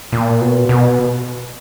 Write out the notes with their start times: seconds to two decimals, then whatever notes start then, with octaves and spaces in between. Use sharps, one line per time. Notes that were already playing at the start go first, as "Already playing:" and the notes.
0.12 A#2
0.41 B2
0.69 B2